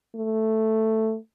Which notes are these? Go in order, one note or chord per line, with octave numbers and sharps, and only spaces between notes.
A3